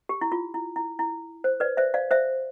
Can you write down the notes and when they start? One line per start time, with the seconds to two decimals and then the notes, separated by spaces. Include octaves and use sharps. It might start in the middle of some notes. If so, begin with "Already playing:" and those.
0.09 G4
0.21 E4
0.32 F4
0.54 E4
0.76 E4
0.99 E4
1.44 C5
1.60 B4 D5
1.77 C5 E5
1.94 D5 F5
2.11 C5 E5